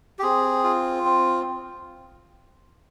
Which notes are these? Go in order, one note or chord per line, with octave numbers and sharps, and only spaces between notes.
G4
C4 G#4
F4
C4